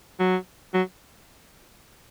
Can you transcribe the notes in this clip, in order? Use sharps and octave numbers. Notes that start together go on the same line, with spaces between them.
F#3
F#3